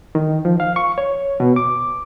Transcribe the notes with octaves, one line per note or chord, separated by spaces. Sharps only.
D#3
F3
F5
C#6
C#5
B2
D6